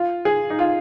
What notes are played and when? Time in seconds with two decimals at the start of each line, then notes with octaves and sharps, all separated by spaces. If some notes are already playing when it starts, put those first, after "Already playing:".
Already playing: F4
0.25 G#4
0.50 D#4
0.59 F4